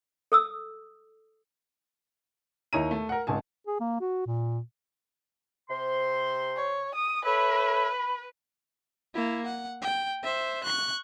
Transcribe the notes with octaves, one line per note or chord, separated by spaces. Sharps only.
A4 D#6 E6
D#2 E4 C#5 D#5 A#5 D#7
A3
A#4 F#5
G#1 C#2 G#5 A5
G#4
A#3
F#4
A#2
C3 C5 C6
C#5
D#6
A4 B4 C#5 E5 B5
A#3 E4
F#5
G5
C5 E5
C#6 F#6